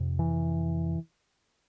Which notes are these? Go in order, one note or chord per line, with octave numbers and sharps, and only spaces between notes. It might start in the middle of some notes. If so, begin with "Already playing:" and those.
Already playing: F2 C3
E3